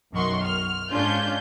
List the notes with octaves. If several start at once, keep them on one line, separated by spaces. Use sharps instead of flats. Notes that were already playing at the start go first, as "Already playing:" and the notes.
B1 F#2 D#3 F#5 C6 C#6
F6
G#2 C#4 D4 F4 G6